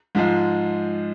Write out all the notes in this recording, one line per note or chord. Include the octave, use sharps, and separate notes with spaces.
G#2 F3 G#3